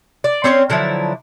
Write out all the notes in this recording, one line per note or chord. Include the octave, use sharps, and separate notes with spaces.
D5
C4 C#4 C5 C#5
D3 F3 F#3 E4